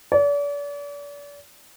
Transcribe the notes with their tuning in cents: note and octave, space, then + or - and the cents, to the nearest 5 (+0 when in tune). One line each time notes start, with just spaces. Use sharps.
D5 -40